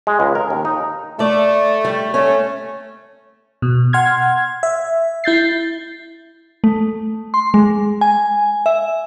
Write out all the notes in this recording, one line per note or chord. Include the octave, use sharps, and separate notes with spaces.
G#3
C#2
A#4
D#2
D#4
A3 A4 D5
G3
A3 C#4
B2
F#5 C6 F6 G#6
E5
E4 G6 A6 C7
A3
C6
G#3
G#5
E5